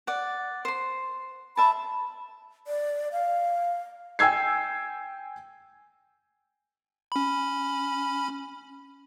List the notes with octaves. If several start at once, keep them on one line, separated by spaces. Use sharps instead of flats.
D5 F#5
C5 C6
E5 A5 B5
D5
F5
G5 G#5 E6 G#6 C7
C#4 B5